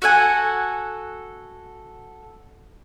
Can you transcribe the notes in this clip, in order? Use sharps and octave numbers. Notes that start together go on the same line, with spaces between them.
F#4 A4 F#5 G#5